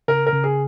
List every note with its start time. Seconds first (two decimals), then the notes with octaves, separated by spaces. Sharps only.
0.08 C#3 A#4
0.27 A#4
0.33 C#3
0.44 G#4